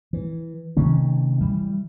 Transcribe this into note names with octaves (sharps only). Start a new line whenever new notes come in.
E3
C3 D#3 A3 C#4
E3 G3